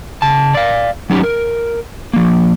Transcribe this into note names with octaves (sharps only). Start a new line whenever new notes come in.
C#3 A5
D5 F5
F#3 C#4 D#4 G4
A#4
F3 A#3